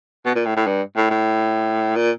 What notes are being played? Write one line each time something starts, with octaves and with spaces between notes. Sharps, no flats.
B2
A#2
A2
A2
G2
A2
A2
A#2